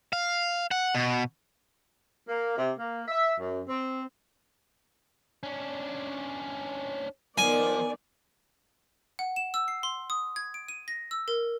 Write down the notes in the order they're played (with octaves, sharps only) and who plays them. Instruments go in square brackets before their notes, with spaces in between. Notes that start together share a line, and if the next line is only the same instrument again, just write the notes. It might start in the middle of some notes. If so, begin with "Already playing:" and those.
[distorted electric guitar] F5
F#5
B2
[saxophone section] A#3
C3
A#3
E5
F#2
C4
[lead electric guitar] C#4 D4
[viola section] D#3 B3 D5 [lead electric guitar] F3 [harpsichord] G#5
[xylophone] F#5
E7
E6
C7
C6
D#6
G#6
D7
D#7
A#6
E6
A#4